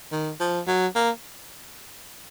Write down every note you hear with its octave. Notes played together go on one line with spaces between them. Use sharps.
D#3
F3
F#3
A#3